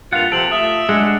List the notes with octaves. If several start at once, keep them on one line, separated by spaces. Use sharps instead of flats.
G2 A#2 F4 F#5 A6 F7
C3 F3 A4 D7 F#7
A3 F4 E5 D#6
G#3 D4 G#4 F#5